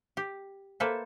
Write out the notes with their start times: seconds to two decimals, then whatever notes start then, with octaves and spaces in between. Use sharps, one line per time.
0.17 G4
0.80 A#3 A4 B4 C5 E5